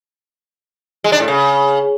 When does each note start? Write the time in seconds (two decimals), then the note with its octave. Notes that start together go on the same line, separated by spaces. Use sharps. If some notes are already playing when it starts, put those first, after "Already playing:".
1.04 G#3
1.12 D4
1.20 A2
1.28 C#3